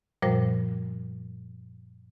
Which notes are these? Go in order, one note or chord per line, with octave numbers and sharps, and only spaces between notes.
F#2 A#2 F3 G3 C5 A#6